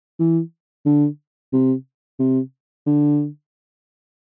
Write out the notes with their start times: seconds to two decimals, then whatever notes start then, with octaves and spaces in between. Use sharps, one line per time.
0.19 E3
0.86 D3
1.53 C3
2.19 C3
2.86 D3